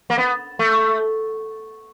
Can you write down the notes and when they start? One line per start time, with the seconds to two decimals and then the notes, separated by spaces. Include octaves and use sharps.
0.10 A#3
0.18 B3
0.59 A3